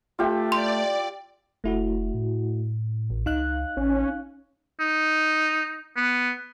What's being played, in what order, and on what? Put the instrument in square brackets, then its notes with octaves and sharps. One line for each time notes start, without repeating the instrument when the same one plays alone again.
[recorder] A3 [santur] F4 G4 E5
[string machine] D5 [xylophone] C6
[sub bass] F1 [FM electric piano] A3 E4 F#4
[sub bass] A2
[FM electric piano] A1
[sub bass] C#2 [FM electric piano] D#4 F5 F#6
[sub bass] A1 [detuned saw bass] C#4
[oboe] D#4
B3